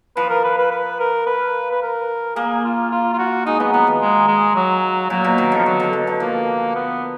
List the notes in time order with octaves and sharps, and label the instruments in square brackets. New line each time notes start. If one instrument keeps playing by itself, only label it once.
[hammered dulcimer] F3 [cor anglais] B4
[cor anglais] A#4
B4
B4
B4
A#4
B4
B4
A#4
[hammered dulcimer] A#3 [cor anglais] G#4
[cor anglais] F4
F4
F4
F#4
[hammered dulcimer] G#3 [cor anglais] D#4
[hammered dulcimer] F#3 [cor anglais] B3
[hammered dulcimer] F3 [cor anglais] B3
[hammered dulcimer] D#3
[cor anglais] G#3
G#3
F#3
[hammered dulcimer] A#2 [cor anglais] F#3
[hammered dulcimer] B2
D#3
D3
[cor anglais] F3
[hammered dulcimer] D3 [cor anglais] F#3
[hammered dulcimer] D3
B2
D3
[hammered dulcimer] F3 [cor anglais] A#3
[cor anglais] B3